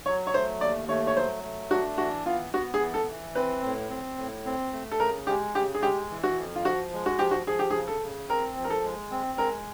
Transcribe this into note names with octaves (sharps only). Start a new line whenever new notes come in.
F#3 C#5
C#5
A3 C5
D#2 D5
A3 C#5
C#5
F#3 C5
A3
D4 F#4
E3 F#4
B3 F4
B3 F#4
G#4
E3
A4
E3
C4 B4
A2
C4
A2
C4
A3
A4
C#3 A#4
G#3 G4
C#3 G4
G#4
G#3 G4
E3
F#4
F2
F4
F3 F#4
G#3
F#4
F3 G4
F#4
F3 G#4
G4
G#4
C#3
A4
C#3
C4 A#4
F3
A#4
A4
G#3
C4
G#3 A#4